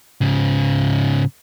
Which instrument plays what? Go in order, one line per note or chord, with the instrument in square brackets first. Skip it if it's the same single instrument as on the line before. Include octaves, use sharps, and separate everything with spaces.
[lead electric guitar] G#2 C#3